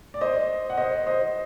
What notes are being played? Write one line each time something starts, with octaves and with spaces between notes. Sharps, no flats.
D5
C5 D#5
F#5
C5 D#5
C5 D#5